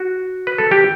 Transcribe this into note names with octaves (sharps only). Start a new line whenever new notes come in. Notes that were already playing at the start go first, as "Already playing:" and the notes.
Already playing: F#4
B4
A4
G4